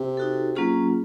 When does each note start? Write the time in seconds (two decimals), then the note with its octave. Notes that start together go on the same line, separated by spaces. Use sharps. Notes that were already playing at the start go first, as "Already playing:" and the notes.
Already playing: C3
0.17 D#4 F#4 A4
0.55 F#3 A#3 C#4 F4 G#4